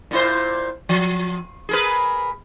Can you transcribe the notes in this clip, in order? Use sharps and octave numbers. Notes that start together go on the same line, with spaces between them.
A#2 E4 C5
F3
G#4 A#4 B4